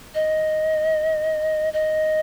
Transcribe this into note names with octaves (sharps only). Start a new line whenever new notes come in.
D#5
D#5